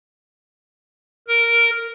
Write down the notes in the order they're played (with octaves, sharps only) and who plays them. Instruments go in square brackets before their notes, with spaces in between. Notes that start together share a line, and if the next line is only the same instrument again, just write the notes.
[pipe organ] A#4